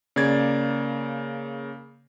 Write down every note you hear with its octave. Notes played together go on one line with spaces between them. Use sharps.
C#3 A#3 D5 G#6 A6